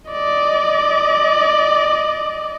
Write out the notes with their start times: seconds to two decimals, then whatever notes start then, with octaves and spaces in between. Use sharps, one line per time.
0.10 D5 D#5